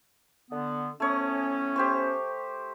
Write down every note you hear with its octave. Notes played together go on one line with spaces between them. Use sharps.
D3 B3
A2 A3 B3 C#4 C#5 D#6
G4 C5 C#6